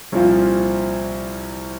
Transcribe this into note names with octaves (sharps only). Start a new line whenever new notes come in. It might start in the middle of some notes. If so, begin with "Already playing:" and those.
C2 A#2 F3 C4 F4